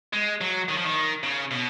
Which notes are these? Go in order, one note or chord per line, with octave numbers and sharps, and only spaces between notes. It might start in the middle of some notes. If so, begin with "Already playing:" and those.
G#3
F#3
D#3
F3
D#3
C#3
B2